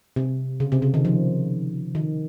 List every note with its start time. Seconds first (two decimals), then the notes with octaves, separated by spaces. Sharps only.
0.16 C3
0.60 C#3
0.72 C3
0.82 C#3
0.94 D#3
1.05 F3
1.95 D#3